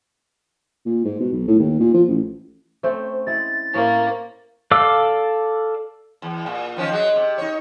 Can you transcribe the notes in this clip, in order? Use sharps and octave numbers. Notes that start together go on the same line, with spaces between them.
A#2
G#2
B2
B1
A2
D#2
A#2
F3
A1
A3 C4 C#4 C5
G#3 E4 A6
A2 A#3 C4 C#4
A4 D5 F5 D6 E6
E2
A#2
D#3 F3 C#4
F#3 G#3
C3
D#4 C#5